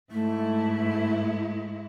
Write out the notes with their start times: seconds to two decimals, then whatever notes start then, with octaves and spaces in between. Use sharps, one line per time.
0.12 G#2 A3 E4